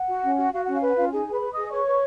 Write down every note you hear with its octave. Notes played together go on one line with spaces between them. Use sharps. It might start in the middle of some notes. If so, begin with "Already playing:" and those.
Already playing: F#5
F#4
C#4
F#4
F#4 F5
C#4 F#5
F5
B4 F#5
C#4 F4 F5
D#4 G#4 G#5
G#4
B4 B5
B4
G#4 D#5 D#6
B4 C#5 C#6
B4